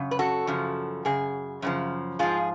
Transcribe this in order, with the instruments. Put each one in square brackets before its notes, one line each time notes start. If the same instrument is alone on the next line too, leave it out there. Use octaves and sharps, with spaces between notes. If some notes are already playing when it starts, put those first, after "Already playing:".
Already playing: [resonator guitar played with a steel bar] F#2 C#3
B4
F#4 A4
F#2 C#3 F3
F#2 C#3 G#4
F#2 C#3 F3
G#2 F3 F4 G#4